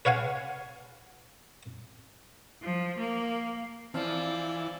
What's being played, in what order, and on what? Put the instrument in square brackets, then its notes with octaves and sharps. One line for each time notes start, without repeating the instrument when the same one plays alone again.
[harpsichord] B4 C#5 F5 F#5 G#5
[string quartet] F3
A#3
[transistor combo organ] E3 [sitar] F3 [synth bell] C4 F6 [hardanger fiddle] D5